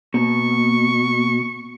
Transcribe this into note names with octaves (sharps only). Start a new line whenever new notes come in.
B2 A#3 C#6